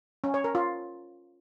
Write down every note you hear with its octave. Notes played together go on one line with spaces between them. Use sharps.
C#4
C#5
A#4
F4